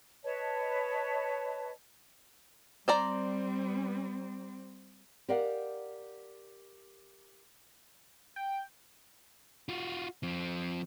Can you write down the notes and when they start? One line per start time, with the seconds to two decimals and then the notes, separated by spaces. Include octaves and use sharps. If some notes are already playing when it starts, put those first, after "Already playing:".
0.24 B4 C#5 D#5 A5
2.88 G3 C4 C5 D5 A#5
5.29 G4 A#4 D5 D#5 F5 F#5
8.36 G5
9.69 F4 F#4
10.23 F3 C4